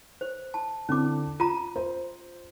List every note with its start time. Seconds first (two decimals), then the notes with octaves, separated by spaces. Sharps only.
0.21 C5
0.54 A5
0.89 D3 C4 C#4 E4 D6
1.40 F4 A#5 D#7
1.76 C5